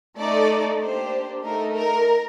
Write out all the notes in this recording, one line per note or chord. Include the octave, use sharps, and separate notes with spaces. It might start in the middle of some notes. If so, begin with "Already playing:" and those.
A3 D#4 A4 D5
A#3 D4 G4 C5
A3 D#4 A4 A#4
A#4